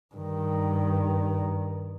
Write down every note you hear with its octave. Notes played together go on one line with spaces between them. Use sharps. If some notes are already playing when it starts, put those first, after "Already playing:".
G2 D#3